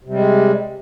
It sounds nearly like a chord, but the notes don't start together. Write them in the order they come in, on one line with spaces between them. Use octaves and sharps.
C3 G3 G#3